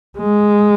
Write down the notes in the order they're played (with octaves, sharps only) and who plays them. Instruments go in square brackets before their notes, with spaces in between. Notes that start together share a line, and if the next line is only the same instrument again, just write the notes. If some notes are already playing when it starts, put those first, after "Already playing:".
[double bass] G#3